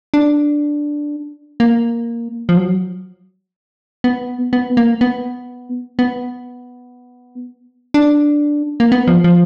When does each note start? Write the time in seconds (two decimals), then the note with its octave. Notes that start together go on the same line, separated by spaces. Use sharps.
0.14 D4
1.60 A#3
2.49 F3
2.57 F#3
4.04 B3
4.53 B3
4.77 A#3
5.01 B3
5.99 B3
7.94 D4
8.80 A#3
8.92 B3
9.08 F3
9.24 F3